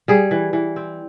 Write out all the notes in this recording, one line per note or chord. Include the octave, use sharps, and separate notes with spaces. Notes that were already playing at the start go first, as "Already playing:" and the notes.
G3 G#4
E3
E3
C4